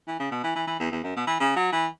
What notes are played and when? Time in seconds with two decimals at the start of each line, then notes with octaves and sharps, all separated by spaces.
0.07 E3
0.19 C#3
0.31 B2
0.43 E3
0.55 E3
0.67 E3
0.80 E2
0.91 E2
1.03 F#2
1.16 B2
1.27 E3
1.40 C#3
1.56 F#3
1.72 E3